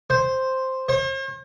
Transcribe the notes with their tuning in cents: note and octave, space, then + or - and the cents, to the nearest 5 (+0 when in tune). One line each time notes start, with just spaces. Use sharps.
C5 +0
C5 +45